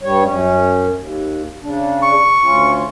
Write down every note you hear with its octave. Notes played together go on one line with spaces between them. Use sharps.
G2 G3 C#5
F#2 C#4
D#2
C#3 D4
C#6
D2 C#4 F4